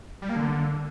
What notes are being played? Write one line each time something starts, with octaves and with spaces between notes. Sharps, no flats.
G3
A#3
D3